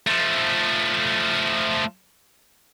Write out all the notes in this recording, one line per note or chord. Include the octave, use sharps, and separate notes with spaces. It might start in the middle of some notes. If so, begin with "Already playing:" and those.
F3 A3